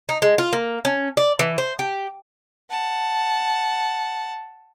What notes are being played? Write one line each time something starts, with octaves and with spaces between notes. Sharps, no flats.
D#4
G#3
F4
A#3
C#4
D5
E3
C5
G4
F#5 A5